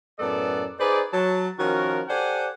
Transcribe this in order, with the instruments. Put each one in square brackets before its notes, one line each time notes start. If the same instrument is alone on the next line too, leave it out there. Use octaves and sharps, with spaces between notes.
[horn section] F#2 A2 B3 A4 D5 A5
D#4 G#4 B4 C5 D5
F#3 A5
D#3 F3 C#4 F#4 A#4
G4 A4 C5 D5 F#5 G#5